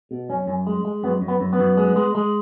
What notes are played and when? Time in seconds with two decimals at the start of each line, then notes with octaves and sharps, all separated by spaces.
0.11 B2
0.29 F#2 C#4
0.47 F#2
0.67 G#3
0.85 G#3
1.03 F#2 B3
1.21 F#2
1.28 B3
1.40 F#2
1.53 B3
1.59 F#2
1.77 G#3
1.96 G#3
2.15 G#3